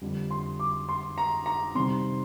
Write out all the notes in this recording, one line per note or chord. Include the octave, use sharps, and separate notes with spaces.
F2 D3 G3
C6
D6
C6
A#5
A#5
C3 D#3 G3 C4 C6